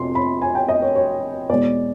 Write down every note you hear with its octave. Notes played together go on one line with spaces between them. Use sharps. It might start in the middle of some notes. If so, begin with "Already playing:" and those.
Already playing: F2 C3 C6
B5
G#5
G5
D#5
C#5
C#5
E2 B2 G#3 D5